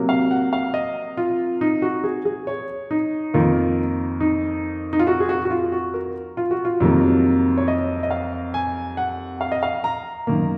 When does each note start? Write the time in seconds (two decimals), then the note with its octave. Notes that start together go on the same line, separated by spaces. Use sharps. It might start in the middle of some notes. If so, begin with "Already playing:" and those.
Already playing: C3 F#3 A#3
0.09 F5
0.31 F#5
0.53 F5
0.74 D#5
1.17 F4
1.61 D#4
1.82 F#4
2.04 G#4
2.25 G#4
2.47 C#5
2.91 D#4
3.34 F2 D#3 A#3 F4
4.20 D#4
4.93 D#4
4.99 F4
5.07 F#4
5.20 G#4
5.29 F#4
5.45 F#4
5.50 F4
5.72 F#4
5.94 A#4
6.37 F4
6.51 F#4
6.65 F4
6.80 F2 C3 D#3 F#3 A#3
7.58 C#5
7.68 D#5
8.03 D#5
8.11 F5
8.54 G#5
8.97 F#5
9.41 F5
9.52 D#5
9.63 F5
9.84 A#5
10.27 F#2 D#3 A#3